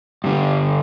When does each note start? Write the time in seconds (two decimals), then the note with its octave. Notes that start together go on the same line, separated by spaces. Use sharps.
0.24 G2 D3 G3